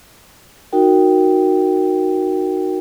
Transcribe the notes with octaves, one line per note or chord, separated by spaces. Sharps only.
D#4 F#4 A#4 G5